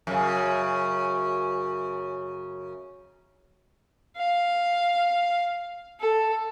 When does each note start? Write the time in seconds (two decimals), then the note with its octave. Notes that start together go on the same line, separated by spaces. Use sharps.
0.07 F#2 C#3
4.17 F5
6.00 A4